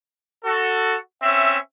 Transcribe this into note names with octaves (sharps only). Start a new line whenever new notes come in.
F#4 A4
C4 C#4 E5